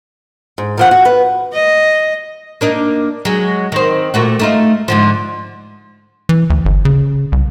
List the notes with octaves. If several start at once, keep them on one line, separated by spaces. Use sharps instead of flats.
G#2
D#3 F3 F#5
F#4
B4
D#5
A#3 D4 D#4
F#3 G#3
D#3 C4
A#2 A3 F#4
A3 D#4 F4
G#2 D3 F3
E3
D2
G1
C#3
C2